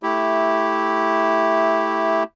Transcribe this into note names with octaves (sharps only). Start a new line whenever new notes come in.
A3 E4 G4